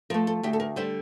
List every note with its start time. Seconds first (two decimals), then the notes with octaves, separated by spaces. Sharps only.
0.10 F3 A#4
0.14 A3
0.27 A4
0.43 D2 G4
0.53 A4
0.60 A#4
0.76 D3 G3 C5